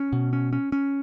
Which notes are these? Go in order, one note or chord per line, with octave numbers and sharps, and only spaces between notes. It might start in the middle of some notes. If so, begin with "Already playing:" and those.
Already playing: C#4
B2
C#4
C#4
C#4